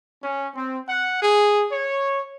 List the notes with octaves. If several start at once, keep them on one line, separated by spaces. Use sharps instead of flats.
C#4
C4
F#5
G#4
C#5